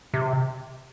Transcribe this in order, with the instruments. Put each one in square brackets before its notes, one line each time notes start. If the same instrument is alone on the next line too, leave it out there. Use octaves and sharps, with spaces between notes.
[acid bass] C3